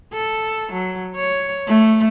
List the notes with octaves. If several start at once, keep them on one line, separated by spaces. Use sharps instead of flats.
A4
F#3
C#5
A3